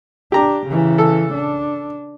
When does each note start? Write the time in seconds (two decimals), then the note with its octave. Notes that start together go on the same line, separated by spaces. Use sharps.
0.32 D4 G4 A#5
0.67 C#3 E3
0.98 A4
1.34 D4